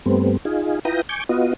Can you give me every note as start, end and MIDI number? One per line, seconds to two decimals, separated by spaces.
0.06 0.37 43
0.06 0.37 55
0.06 0.37 57
0.06 0.37 59
0.06 0.37 60
0.45 0.79 63
0.45 0.79 65
0.45 0.79 68
0.85 1.02 64
0.85 1.02 65
0.85 1.02 71
0.85 1.02 79
0.85 1.02 82
0.85 1.02 87
1.09 1.24 80
1.09 1.24 85
1.09 1.24 86
1.09 1.24 91
1.29 1.54 59
1.29 1.54 65
1.29 1.54 66
1.29 1.54 75